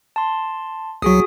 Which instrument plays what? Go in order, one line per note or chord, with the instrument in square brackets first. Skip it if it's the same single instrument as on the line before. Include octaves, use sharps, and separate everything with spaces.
[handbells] A5 C6
[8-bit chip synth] C2 F#3 [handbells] F#4 G#4 D#6